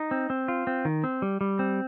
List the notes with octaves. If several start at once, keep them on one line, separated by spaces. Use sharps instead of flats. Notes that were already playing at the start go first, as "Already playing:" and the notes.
Already playing: D#4
C4
C4
F4
C4
D#3
C4
G3
G3
C4